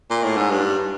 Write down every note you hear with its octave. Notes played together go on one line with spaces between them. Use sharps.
A#2
A2
G#2
G2